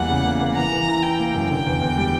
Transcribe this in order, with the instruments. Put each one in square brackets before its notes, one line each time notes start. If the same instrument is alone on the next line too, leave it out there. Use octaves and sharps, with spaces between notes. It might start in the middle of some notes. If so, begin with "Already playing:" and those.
Already playing: [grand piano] E2 E3 G3 A#3 [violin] F#5
[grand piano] C#3
A#3
A#3
[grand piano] E3 [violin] A#5
[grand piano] E3
E4
[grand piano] E4 [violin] G5
[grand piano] A#3
F#2
[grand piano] D3 [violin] G5
[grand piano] E2
E2
G3